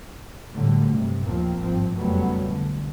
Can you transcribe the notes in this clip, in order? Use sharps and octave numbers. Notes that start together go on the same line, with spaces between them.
A2 D3 F#3 G3 A3 A#3
G2 C3
D#2 A#2 F3 A#3 C4
G#1 G2 F3 C4
F#1 F2 F#3 G3 A3 B3
B1 D3